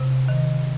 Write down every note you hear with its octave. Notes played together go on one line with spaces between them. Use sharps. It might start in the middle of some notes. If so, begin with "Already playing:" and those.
Already playing: C3
D#3